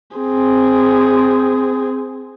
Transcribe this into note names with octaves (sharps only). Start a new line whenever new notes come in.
C4 G#4